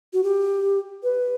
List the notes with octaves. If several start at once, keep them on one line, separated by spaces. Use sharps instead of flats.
F#4
G4
B4